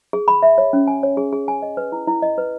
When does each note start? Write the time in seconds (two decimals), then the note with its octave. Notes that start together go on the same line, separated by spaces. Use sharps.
0.13 G#4
0.28 B5
0.43 E5
0.58 C#5
0.73 C#4
0.87 G#5
1.03 C#5
1.17 G#4
1.33 G#4
1.48 G#5
1.62 D#5
1.77 B4
1.92 E4
2.07 E4
2.22 D#5
2.38 B4